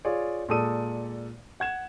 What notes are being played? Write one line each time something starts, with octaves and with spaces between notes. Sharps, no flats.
F4 G#4 C#5 D5
A#2 G#3 A4 D5 D#6 D#7
F#5 G#6 E7